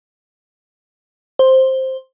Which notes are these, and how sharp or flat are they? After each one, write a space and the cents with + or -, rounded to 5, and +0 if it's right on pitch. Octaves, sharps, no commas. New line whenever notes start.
C5 +5